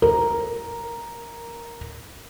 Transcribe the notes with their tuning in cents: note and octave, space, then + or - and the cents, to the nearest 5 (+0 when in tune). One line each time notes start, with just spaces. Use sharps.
A#4 +0